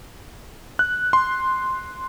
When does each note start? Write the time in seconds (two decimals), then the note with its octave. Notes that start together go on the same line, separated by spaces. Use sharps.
0.79 F#6
1.13 C6